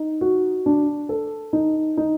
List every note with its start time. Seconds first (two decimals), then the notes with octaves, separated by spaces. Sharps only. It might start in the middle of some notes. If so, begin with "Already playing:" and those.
Already playing: D#4
0.21 F#4
0.66 D4
1.09 A4
1.53 D#4
1.97 D#4